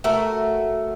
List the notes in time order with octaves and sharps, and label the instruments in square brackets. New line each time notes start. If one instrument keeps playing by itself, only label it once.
[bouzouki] A3 F#4 A#4